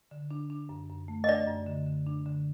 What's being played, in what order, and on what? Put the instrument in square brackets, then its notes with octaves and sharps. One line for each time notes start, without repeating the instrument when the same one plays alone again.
[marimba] D3
D4
D4
F#2
F#2
A3
[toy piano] D#5
[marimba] D4 [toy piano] D5
[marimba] F#2
D3
D3
D4
D3